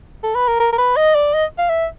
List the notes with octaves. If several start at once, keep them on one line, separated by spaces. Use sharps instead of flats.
A4
B4
A#4
A#4
A#4
B4
D#5
D5
D#5
F5
E5